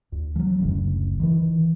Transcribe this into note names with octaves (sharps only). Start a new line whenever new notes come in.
D2
F3 F#3
F#1 D2 C#3
D#3 E3